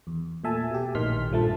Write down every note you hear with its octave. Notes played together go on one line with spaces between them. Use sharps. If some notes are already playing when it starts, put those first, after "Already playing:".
E2
A#2 A3 E5 G#5 A5
B2 G4
A#1 A2 D#3 C6 F6 B6
A#1 G2 F3 A3 A5